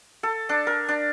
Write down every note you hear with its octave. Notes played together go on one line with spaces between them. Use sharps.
A4
D4
A#4
D4